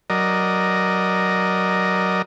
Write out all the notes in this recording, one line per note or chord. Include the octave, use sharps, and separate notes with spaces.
F#3 A#4 D5 D#5